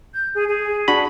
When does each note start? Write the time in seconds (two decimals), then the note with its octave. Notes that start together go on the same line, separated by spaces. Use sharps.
0.13 G6
0.34 G#4
0.48 G#4
0.88 D4 F#4 B5